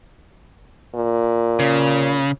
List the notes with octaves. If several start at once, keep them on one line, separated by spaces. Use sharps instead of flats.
A#2
C#3